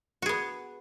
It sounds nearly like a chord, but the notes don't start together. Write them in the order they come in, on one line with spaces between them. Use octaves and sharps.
F#4 G#4 B3